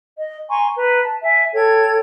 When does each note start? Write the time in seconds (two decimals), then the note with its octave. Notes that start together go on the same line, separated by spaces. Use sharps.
0.19 D#5
0.49 G#5 A#5 C6 C#6
0.76 B4 A#5
1.04 A5
1.23 E5 G#5
1.53 A4 C#5 G5 G#6